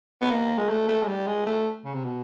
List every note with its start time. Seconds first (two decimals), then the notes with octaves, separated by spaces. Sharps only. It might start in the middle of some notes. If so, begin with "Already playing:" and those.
0.21 B3
0.31 A#3
0.58 G#3
0.69 A3
0.88 A3
1.02 G#3
1.08 G3
1.27 G#3
1.46 A3
1.85 C#3
1.94 C3
2.04 B2